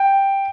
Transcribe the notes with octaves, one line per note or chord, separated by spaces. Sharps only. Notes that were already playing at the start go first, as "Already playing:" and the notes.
Already playing: G5